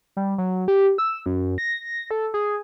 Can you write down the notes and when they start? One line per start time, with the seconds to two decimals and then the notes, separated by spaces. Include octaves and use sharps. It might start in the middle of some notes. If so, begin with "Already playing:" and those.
0.17 G3
0.38 F#3
0.68 G4
0.98 E6
1.26 F#2
1.58 A#6
2.11 A4
2.34 G#4